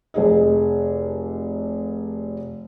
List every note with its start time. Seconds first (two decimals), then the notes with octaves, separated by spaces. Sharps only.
0.14 F1 G#4 D#5